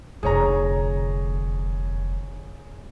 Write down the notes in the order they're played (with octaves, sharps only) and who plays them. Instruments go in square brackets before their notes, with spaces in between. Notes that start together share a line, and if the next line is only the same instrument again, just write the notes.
[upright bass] F1 D3 [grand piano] G#4 C#5 A#5